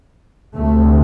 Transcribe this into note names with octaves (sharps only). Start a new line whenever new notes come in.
D2 C3 A3